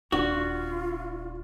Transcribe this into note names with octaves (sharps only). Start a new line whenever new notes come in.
D#1 D4 F4 F#4